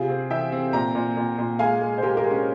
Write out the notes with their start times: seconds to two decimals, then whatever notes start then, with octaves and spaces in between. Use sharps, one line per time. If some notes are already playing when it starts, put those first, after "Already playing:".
Already playing: C3 F4 G#4
0.09 C4
0.30 E3 E5 G5
0.52 C4
0.73 A#2 G5 A#5
0.95 A#2
1.17 A#2
1.38 A#2
1.59 G#3 F5 G#5
1.81 G#3
1.98 C5
2.02 G#3 G4 A#4
2.17 G4 A#4
2.24 G#3
2.31 C#4